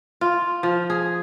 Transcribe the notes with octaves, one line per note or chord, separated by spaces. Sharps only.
F4
F3
G#4